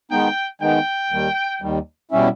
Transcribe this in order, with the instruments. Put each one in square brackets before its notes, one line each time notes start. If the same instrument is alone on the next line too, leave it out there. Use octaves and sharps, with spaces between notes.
[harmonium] D#3 G#3 B3 D#4 [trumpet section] G5
[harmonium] D#3 G#3 B3 D#4 [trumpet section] G5
[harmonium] D#2 D#3 G3
D#2 D#3 G3
B2 G3 C#4 E4